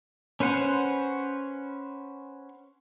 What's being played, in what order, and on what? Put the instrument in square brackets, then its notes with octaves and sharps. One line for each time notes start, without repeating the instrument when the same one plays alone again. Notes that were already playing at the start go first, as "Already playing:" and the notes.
[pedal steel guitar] C#4 B4 C5 F#5